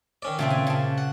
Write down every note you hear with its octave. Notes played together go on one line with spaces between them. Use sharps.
D#3 C#4 D5
A#2 C#3 A3 C4
G#5
C#3 A5
F#5